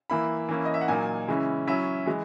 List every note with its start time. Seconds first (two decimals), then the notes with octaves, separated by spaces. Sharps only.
0.10 E3 A#3 E4 B5
0.49 E3 A#3 C#4 E4
0.65 D#5
0.74 E5
0.81 F#5
0.88 A#2 F#3 A#3 D#4 G#5
1.28 C#3 E3 G#3 C#4 E4
1.67 F#3 C#4 E4 E5
2.06 E3 G#3